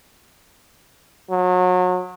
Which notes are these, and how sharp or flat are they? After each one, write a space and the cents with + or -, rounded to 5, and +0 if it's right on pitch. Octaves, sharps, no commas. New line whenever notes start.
F#3 -30